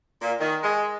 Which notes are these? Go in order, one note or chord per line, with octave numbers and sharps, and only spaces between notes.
A#2
D#3
G#3